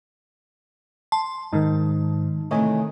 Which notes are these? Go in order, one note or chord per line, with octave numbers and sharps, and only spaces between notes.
A5 C6
G#2 D#3 D#4
C3 D#3 E3 A3 C#5 D#5 G#5